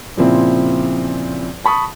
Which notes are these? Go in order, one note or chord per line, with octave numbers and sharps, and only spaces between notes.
A#2 C#3 F3 C4 E4
A5 B5 C#6 D#6